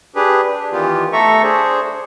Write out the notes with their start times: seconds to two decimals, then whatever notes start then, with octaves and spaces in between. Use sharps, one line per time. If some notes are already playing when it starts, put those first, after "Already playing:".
0.16 D4 G4 G#4 B4
0.47 D4
0.72 D#3 E3 B3 F4 G4
1.13 A3 A4 E5 A#5 C#6
1.43 D4 G#4 C5